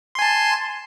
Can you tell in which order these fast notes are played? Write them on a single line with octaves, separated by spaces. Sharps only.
C6 G#5 A5